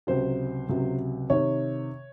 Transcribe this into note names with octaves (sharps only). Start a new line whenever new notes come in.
C#2 C3 F#3 C5
C#2 C3 F#3
C3 D#3 C#5